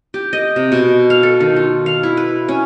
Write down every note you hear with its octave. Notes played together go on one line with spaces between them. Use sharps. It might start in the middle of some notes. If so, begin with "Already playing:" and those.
G4
D#5
C3
B2
F5
A4
D#3
F4
F5
E4
B4
C#4